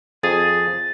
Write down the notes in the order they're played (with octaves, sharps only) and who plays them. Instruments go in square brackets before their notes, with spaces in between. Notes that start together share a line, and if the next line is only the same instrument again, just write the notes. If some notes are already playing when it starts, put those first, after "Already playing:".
[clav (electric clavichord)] F2 [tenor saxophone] G#4 [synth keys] A6